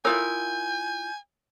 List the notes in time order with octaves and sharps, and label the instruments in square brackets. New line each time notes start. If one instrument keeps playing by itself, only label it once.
[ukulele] E4 F4 A#4 [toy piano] C#5 D#6 E6 [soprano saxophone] G#5 [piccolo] G6